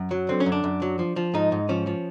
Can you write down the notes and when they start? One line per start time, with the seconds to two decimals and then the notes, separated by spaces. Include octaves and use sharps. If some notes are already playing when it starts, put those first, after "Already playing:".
Already playing: F#2
0.11 F#3
0.29 D3 C4
0.40 C#4
0.46 F#2
0.52 D4
0.64 F#2
0.82 F#3
0.99 F3
1.16 F3
1.34 G#2 D#4
1.52 G#2
1.69 F3 C#4
1.87 F3